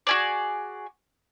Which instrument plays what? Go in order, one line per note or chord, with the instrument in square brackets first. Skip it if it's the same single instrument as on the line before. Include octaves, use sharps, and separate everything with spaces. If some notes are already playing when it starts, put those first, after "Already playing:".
[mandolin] F#4 G#4 D5